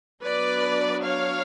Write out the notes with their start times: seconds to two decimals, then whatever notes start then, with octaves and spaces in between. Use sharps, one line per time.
0.23 F#3 B3 D4 B4 D5
1.04 C#5 F5